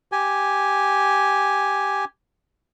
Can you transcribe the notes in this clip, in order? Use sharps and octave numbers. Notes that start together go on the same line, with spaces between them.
G4 G#5